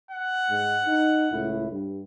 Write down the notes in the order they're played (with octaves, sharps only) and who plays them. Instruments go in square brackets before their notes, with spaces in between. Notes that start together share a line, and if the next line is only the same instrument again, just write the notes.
[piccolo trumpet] F#5
[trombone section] G#2 G#3
D#4
C#2 A2 E4
G2